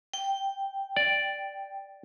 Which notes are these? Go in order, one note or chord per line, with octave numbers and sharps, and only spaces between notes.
G5
D5